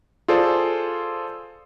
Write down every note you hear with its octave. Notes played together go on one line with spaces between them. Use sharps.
F4 G#4 A4 C5 D5